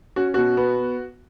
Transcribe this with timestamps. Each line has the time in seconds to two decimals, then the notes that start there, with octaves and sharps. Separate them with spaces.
0.16 C#4 F#4
0.34 B2 F#4
0.57 B3